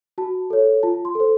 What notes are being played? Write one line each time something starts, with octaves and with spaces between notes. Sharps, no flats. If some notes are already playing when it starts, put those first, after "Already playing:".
F#4 A5
A4 C#5
F4 A5
C6
A4 C5